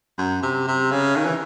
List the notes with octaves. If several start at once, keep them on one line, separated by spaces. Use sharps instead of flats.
F#2
C3
C3
C#3
D#3
E3